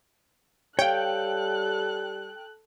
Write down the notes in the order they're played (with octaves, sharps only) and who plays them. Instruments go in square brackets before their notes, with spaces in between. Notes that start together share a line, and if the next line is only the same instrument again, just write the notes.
[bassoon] G3 [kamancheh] A4 F#6 [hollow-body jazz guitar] C#5 F5 [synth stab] G5